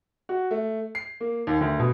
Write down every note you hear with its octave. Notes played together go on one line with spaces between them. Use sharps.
F#4
A3
C7
A#3
D#2
D2
B2